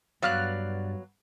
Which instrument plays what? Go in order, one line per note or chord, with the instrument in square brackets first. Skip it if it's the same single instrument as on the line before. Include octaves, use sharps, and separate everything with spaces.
[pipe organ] G2 [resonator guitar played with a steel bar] F#3 B3 F5 [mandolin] D5 F6 F#6